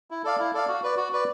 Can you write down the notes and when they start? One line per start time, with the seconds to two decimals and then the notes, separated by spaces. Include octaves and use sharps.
0.11 E4
0.24 A4 D5 F5
0.40 E4
0.54 A4 D5 F5
0.69 F#4
0.83 B4 D5
0.97 F#4
1.13 B4 D5